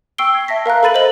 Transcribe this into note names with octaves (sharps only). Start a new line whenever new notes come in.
G5 C#6 E6 C7 D7 G7
G#6
E5 A5 A#6 B6
A#4 F5 A#5 F#6
A4 B4 B5 A6 D#7 F#7
C5 D#5 F#7